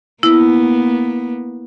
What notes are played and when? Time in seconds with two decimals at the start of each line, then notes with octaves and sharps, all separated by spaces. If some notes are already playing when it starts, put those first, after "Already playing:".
0.23 A#3 B3 E4